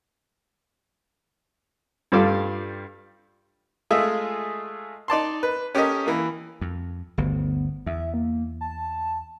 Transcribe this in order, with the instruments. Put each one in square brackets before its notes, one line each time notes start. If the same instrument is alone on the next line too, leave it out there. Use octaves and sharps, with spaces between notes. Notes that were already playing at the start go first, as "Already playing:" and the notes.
[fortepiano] G2 G3 F4 A4 F5 D6
G#3 A3 F4 G#4 D#5 E5
D#4 D5 A5 C6
B4
C#4 G4 A4 A#4 D#5
E3 A#3
[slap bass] F2
[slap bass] G1 D2 [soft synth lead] B3
[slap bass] E2 [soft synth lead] E5
[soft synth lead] A#3
A5